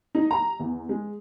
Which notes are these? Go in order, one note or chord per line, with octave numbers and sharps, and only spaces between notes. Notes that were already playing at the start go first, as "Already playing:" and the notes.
D#4
A#5
E2
G#3